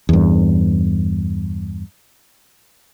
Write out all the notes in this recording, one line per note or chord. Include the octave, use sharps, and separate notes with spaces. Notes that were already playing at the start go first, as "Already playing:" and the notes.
E2 G2